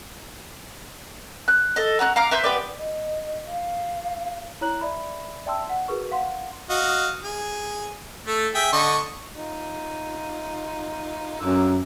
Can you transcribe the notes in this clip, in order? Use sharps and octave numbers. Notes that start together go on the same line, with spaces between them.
F#6
A4 D#5
F#4 A#5 D#6 F#6
F5 A#5 D6 F6
B4 E5 C6 G6
B3 G4 B4 D5
D#5
F5
E4 C#5 A#5 F#6 F#7
D5 E5 B5
D5 E5 G5 A5 C6 E6
F#5
F#4 G#4 A#4 B4 C#6
F5 F#5 C6
F#4 D#5 F5
G#4
A3 A4
G#4 E5 G5
D3 D#5 C#6
D#4 F4
F#2 D3 A#3 E6